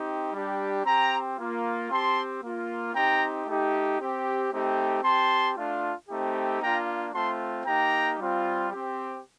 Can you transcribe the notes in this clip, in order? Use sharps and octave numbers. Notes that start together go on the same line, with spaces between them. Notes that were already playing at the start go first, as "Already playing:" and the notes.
Already playing: C4 D#4 G4
G3 D4 G4
C4 G4 G5 A#5
A#3 F4
C4 G4 A5 C6
A#3 F4
C4 D#4 G4 G5 A#5
A3 D#4 G4
C4 G4
A3 C4 D#4 G4
C4 G4 A5 C6
A3 D4 F4
A3 C4 D#4 G4
A#3 D4 F4 G5 A#5
A3 C4 F4 A5 C6
A#3 D#4 G4 G5 A#5
G3 C4 F4
G4
C4